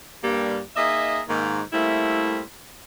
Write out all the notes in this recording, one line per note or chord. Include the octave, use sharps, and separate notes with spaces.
G2 G3 A#3
A#3 D#4 G#4 D#5 E5
G#2 D#3 A#3
G3 A3 A#3 C4 E4